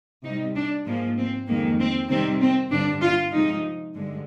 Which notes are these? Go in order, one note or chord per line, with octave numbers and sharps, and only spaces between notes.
C3 G3 D#4
D4
G#2 F3 G#3 A#3
C4
F2 D#3 G#3 A#3
C4
C3 D#3 G3 C4
C4
G2 D3 G3 D4
F4
C3 F3 G#3 D#4
G2 D3 G#3